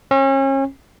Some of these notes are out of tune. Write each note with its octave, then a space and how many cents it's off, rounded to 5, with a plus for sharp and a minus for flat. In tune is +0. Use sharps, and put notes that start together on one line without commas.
C#4 -35